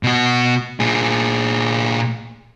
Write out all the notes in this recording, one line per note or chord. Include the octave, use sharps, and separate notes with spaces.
B2 F#4
A#2 G#4